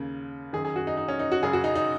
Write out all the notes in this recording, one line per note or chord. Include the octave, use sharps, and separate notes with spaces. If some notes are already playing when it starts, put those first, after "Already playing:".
Already playing: D#2 C#3
F#2 D#3 G#4
G#4
F#4
D#4
D#4
C#4
D#4
F#4
F#2 C#3 G#4
F#4
D#4
D#4